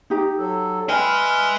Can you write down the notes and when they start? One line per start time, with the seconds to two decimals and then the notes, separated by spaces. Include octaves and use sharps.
0.10 D#4 G4 A#5
0.39 F#3 A4
0.89 B4 D#5 E5 G5 G#5 B5 F6